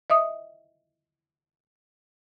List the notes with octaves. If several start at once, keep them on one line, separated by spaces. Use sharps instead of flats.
D#5 E5 D#6